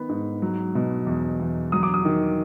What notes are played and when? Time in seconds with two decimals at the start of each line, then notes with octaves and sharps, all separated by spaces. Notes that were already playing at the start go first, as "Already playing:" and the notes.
Already playing: D#3 B3 B5
0.09 G#2
0.42 F#3
0.75 B2
1.07 E2
1.39 E2
1.72 F#3 D#6
1.83 D6
1.94 D#6
2.05 D#3